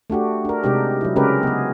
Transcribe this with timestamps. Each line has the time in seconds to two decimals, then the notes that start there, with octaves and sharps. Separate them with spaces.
0.10 A3 D4 F#4 G4
0.45 D4 A#4
0.64 C3 G#3 D4 D#4 G4
1.01 F#3 E4
1.16 C#3 G#3 C#4 G4 A#4 B4
1.43 B3 G#4